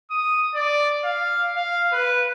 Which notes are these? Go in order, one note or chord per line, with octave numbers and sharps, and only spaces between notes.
D#6
D5
F5
F5
B4